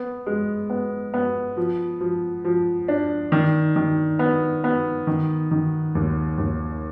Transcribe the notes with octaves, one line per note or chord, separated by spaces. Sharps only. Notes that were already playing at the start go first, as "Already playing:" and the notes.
Already playing: B3
G#3
B3
B3
F3
F3
F3
D4
D#3
D#3
B3
B3
D#3
D#3
D#2
D#2